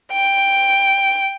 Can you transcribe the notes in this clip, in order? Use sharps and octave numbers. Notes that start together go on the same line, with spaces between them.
G5